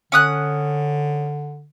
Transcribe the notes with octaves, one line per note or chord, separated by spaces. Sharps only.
D3 C#4 D#6 F#6